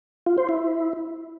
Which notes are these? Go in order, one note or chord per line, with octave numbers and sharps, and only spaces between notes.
F4
C5
E4